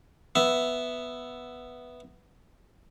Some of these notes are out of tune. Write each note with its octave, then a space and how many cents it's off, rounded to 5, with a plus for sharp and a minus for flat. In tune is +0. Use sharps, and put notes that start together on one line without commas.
B3 +0 E5 +0